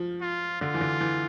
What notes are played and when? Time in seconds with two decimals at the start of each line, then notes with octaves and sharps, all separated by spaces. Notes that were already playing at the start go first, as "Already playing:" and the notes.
Already playing: F3
0.22 F4
0.61 D3 F4
0.74 E3
0.81 D3
1.01 E3